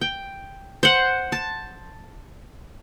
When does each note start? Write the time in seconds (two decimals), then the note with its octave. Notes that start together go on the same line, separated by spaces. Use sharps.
0.01 G5
0.83 C5 F#5
1.32 A5